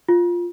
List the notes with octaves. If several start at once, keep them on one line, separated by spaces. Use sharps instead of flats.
F4